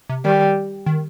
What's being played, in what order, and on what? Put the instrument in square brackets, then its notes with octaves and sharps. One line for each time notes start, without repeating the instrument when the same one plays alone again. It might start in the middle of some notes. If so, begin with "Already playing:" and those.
[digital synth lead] C3
[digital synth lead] D#3 [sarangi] G3
[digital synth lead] D#3